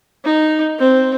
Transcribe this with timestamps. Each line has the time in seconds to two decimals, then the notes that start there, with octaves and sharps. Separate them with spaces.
0.24 D#4
0.79 C4